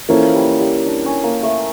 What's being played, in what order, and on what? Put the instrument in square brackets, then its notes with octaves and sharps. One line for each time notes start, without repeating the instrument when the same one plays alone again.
[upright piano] E3 A#3 C#4 E4 A4 [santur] F3
[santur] G3
G3
D4
C#4
A#3
A3